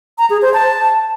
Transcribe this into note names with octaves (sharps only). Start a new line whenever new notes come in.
A#5
G#4
C5
A5